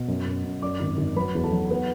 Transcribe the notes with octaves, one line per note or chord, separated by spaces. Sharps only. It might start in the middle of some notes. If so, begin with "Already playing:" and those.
Already playing: B2
F#2
F#2
F#2
F#2 D5 D6
G#1
G#1
F#3 B4 B5
E2
A4 A5
F#3
B3